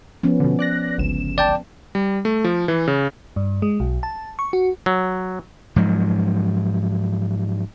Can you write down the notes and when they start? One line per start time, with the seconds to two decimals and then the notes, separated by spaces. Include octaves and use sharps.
0.23 F3 B3 C#4
0.40 B2 D3
0.59 D5 F#6 A#6
0.98 G1 C#2 E7
1.38 D5 G5 A5
1.95 G3
2.25 A3
2.44 F3
2.68 E3
2.88 C#3
3.36 G2
3.62 G#3
3.80 B1
4.03 A5
4.39 C#6
4.53 F#4
4.86 F#3
5.76 G#2 F3 F#3